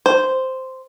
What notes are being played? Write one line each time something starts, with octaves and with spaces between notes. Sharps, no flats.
C5